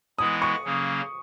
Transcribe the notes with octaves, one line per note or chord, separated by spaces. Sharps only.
E3 G#3 B3 E4 D#6
C#6
C#3 F#3 A#3 C#4